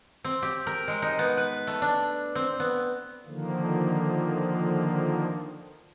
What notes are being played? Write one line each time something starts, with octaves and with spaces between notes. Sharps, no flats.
C4
G4
A#4
G#3
D#4
B3
B4
A3
D4
C4
B3
D3 D#3 F3 A#3